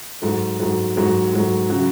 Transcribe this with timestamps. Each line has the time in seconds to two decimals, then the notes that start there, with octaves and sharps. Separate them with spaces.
0.22 G#2 F#3 A3
0.59 G#2 F#3 A3
0.95 G#2 F#3 A3
1.32 G#2 F#3 A3
1.70 C#3 F#3